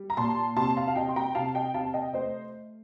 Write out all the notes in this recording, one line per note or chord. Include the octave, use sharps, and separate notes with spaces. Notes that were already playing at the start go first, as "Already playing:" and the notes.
Already playing: G3
A#5
A#2 A5 C6
C3 A5 C6
F5 A5
F5
C3 D#5 G5
C6
G5 A#5
C3 F5 A5
D#5 G5
C3 F5 A5
D#5 G5
A3 C5 D#5